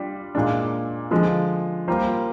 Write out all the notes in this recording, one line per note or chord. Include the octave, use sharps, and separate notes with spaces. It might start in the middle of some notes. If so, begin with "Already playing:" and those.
Already playing: G3 D4 F4
A#2 G#3 D4
D3 F3 G#3
G3 A#3 F4 C5